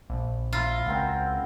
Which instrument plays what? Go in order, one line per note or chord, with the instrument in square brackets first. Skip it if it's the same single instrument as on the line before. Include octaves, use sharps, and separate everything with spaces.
[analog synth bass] A#1
[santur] E4 A#5 [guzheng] F4
[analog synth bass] C#2 [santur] C4 A#4 F#5